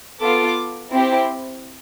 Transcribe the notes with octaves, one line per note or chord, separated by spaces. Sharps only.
B3 F4 A4 D6
C4 E4 G4